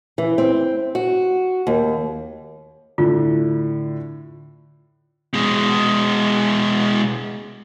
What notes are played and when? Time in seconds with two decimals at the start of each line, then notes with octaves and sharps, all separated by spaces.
0.18 E3
0.38 C4
0.95 F#4
1.67 D#2
2.98 A2 D3 F4
5.34 B2 G#3